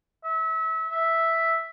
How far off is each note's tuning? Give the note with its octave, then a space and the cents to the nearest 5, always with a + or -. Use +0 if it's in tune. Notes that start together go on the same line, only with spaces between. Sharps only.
E5 -30
E5 +0